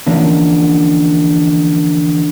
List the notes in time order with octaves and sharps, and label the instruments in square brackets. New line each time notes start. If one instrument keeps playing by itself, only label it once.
[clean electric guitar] D3 E3 F3 A#3 C#4 D4